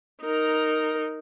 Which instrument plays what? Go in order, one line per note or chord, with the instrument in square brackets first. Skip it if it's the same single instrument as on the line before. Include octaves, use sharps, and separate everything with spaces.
[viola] D#4 A#4